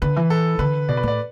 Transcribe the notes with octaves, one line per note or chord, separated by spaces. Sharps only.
D3 B4
E3
A4
D3 B4
B2 D5
B4
A2 D5